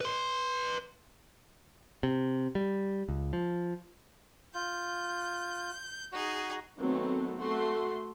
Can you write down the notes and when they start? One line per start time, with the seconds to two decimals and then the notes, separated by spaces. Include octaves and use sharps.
0.01 B4 C6
2.03 C3
2.55 G3
3.09 C#2
3.33 F3
4.54 F4 G6
6.12 D#4 F#4 G#4
6.77 D#3 F#3 A3 B3 C4
7.37 A3 F#4 C6